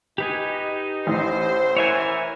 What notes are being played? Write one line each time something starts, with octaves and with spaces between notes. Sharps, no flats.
D#4 G4 B4 G#5
A1 C5
E3 A#4 C#5 E5 G#5